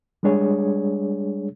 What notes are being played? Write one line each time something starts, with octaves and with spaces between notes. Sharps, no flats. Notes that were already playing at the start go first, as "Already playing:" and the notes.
G3 G#3 D4 G#4 C#5